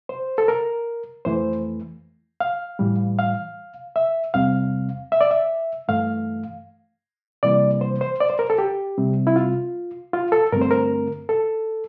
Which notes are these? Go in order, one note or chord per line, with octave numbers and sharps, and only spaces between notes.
C5
A4
A#4
F2 E3 A3 C5
F5
A2 E3 G3
F5
E5
E2 C3 G3 C4 F5
E5
D5
E5
G2 E3 A3 F5
C3 E3 G3 A#3 D5
C5
C5
D5
C5
A#4
A4
G4
C3 G3 C4
E4
F4
F4
A4
G2 D3 A3 C4 A#4
C5
A#4
A4